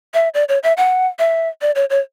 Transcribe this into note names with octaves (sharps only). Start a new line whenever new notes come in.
E5
D5
C#5
E5
F#5
E5
D5
C#5
C#5